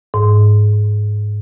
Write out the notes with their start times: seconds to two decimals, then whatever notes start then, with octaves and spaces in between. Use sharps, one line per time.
0.14 G#2